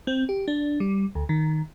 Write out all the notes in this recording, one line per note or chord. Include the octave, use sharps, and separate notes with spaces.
C4
G4
D4
G3
D2
D#3